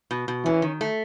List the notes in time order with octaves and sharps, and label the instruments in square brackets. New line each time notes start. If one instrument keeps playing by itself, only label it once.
[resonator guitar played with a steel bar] B2
B2
[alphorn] E3 [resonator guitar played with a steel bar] C#4
[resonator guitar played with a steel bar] D#3
A3